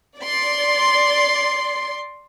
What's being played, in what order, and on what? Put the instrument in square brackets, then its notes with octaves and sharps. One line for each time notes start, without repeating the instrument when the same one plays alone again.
[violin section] D5 C6